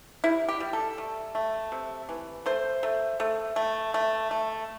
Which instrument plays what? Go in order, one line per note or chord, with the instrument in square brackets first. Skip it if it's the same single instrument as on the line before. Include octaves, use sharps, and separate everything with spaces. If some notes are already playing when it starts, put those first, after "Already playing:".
[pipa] G3 E4
G4
G3
A4
A3
A3
C3
E3
A3 C5
A3
A3
A3
A3
A3